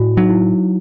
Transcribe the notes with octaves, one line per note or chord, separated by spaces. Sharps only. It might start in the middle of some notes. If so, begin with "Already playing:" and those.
Already playing: A2 E4 F#4
F#3 D#4
E4